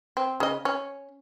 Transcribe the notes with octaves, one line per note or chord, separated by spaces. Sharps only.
C4
C#3 D#5
C#4